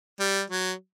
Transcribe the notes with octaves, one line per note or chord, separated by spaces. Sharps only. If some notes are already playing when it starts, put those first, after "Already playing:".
G3
F#3